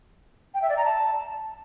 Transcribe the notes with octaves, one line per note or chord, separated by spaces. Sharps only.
G5
E5
D5
A#5
A5